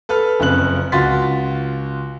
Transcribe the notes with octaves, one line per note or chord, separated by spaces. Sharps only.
A4 B4 B5 F6
F#1 F2 C#3 F#6 F#7
C#2 F4 F#4 C6 A6 B6